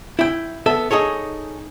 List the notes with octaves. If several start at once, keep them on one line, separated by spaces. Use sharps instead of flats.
E4 G5
B3 A4 E5
D#4 G#4 A4 C#5